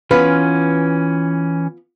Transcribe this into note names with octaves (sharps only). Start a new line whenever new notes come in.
E3 B3 C#4 F4 B4 F6